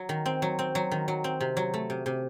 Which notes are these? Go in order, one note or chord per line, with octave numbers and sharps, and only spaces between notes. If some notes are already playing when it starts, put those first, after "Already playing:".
Already playing: F#3
D#3
C4
F#3
C4
F#3
D#3
F#3
C4
C3
F#3
A3
C3
C3